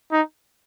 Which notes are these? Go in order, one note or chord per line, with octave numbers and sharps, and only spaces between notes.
D#4